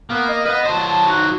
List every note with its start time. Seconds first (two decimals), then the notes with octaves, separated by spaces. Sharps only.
0.10 A#3 B3
0.29 D#5
0.46 B3 B4 D#5
0.65 F#3 C5 A5
0.82 A5
1.07 D#4 F#4